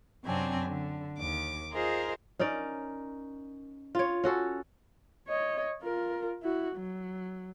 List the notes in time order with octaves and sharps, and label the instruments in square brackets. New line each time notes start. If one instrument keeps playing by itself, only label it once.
[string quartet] F#2 C3 F#3 C4 D4 G#5
D3
D#2 D6
F4 G#4 A#4 C5 D#5
[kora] C#4 D#4 A#4 D5
F4 C#5
C#4 F#4 A4
[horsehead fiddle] C#5 D#5
F4 A#4
E4 F#4
F#3